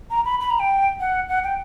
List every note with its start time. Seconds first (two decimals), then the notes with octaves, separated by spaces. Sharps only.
0.11 A#5
0.25 B5
0.40 B5
0.50 A#5
0.60 G5
1.00 F#5
1.29 F#5
1.44 G5